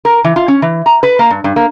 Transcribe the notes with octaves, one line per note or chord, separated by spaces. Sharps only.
A#4
E3
F4
C#4
E3
A#5
B4
A#3
G2
G2
A#3